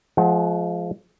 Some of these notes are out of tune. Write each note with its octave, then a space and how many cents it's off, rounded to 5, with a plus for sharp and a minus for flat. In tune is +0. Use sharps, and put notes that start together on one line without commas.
F3 +0 G#3 +35 F#5 +0